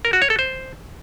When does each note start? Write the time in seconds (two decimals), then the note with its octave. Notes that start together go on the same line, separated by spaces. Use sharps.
0.05 A#4
0.13 F#4
0.22 C#5
0.30 A4
0.39 C5